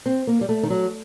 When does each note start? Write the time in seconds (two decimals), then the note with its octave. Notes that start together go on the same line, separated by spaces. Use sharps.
0.06 C4
0.27 A#3
0.41 G3
0.49 A3
0.63 D#3
0.70 F#3